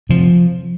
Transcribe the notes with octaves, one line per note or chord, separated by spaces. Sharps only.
C3 F3